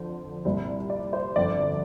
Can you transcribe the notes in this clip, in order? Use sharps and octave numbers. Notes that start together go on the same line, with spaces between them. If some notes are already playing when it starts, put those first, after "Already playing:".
Already playing: F2 D3 F3 C5
C2 A#2 G3 C4
D5
C5
G1 F2 D3 D5